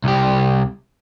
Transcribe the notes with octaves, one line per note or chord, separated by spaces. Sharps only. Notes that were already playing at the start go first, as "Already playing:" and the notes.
C2 G4